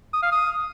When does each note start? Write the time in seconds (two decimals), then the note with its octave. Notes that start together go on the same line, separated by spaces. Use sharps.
0.13 D#6
0.23 F5
0.32 D#6